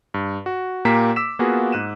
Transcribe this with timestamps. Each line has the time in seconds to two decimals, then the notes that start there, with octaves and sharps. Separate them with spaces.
0.14 G2
0.46 F#4
0.85 A#2 A#3 G4 A#5 B6
1.16 D6 E6 B6 E7
1.39 A#3 B3 F4 F#4 G#4
1.72 G#2 F#6 D#7 E7